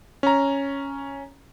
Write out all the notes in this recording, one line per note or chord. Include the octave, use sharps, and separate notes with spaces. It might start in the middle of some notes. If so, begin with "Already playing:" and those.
C#4 A#5